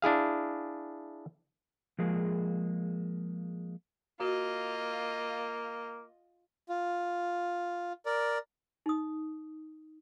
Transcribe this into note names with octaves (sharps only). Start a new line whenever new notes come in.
D4 E4 G#4 F5
F3 G#3 A#3 G#4
A#3 F4 F#4 D#5
F4
A#4 D5
D#4 D#6